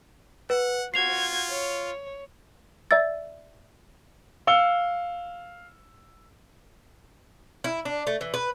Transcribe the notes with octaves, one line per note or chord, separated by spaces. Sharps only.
B4 F#5
F4 F#4 G#6 C7 F7
C#5
D5 E5 E6 A6
F5 E6 C#7 G7
E4
D4
A3
E3
B4